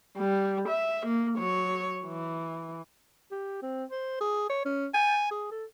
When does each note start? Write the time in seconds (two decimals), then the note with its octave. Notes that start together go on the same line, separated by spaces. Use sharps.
0.18 G3
0.69 E5
1.06 A#3
1.38 F#3 C#5
2.06 E3
3.31 G4
3.62 C4
3.91 C5
4.21 G#4
4.49 C#5
4.65 C#4
4.94 G#5
5.31 G#4
5.51 A4